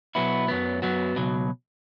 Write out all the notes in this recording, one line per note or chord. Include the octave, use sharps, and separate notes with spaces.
B2 F#3 B3 E4
F#2 F#3 B3
F#2 F#3 B3 F#4
C#2 B2 F#3